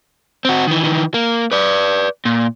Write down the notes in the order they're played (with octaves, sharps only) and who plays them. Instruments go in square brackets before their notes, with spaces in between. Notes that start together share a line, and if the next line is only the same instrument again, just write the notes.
[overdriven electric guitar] C4 F#4
D#3 E3
D#3 E3
A#3
B4 D5
A#2